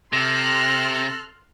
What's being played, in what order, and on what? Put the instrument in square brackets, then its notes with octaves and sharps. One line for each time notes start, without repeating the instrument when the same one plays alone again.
[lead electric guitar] C3 [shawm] A4 [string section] C6 F6 F#6 [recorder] A#6